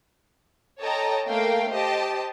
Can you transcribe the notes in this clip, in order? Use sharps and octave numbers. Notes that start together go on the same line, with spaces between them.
A4 C#5 D#5 G5 A5 A#5
A3 A#3 A#4 F5 G5
G4 C5 D#5 A5